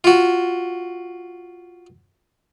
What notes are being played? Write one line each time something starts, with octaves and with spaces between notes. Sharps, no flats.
F4 F#4